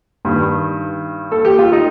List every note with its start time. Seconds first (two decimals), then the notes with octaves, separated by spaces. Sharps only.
0.25 G2 D#3
1.32 A4
1.45 G4
1.59 F4
1.72 D#4